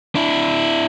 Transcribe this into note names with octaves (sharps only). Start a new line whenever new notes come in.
D4 E4